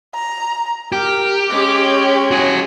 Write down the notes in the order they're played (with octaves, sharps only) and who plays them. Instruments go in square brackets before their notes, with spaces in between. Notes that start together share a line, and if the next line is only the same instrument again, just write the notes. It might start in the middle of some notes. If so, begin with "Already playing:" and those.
[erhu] A#5
[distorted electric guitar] G4 [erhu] A#4
[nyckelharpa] G#3 C#4 [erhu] D6
[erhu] C#5
[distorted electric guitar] F#4 G#4